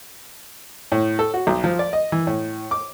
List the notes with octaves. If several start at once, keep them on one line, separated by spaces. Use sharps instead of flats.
A2
A4
F#4
B1
F3
D5
D#5
E3
A2
D6